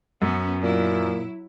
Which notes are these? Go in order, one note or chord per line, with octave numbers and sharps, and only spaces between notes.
F#2 B3 C#4
A#2 F#3 E4